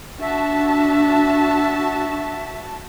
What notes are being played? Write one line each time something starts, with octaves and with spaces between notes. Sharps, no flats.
D4 F#4 E5 A5